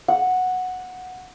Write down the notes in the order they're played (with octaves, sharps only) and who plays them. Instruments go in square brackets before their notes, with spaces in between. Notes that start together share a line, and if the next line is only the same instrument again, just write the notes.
[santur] F#5